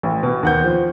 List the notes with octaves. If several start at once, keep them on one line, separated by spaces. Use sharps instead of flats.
A1
B2
D#2 F#5 G6
F3